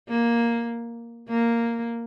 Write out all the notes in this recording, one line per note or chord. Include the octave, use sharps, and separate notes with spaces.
A#3
A#3